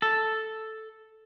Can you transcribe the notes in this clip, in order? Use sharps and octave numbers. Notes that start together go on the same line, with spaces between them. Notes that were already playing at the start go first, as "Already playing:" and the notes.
A4